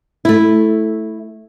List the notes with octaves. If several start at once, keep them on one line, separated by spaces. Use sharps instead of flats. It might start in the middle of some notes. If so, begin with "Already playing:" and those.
A3 E4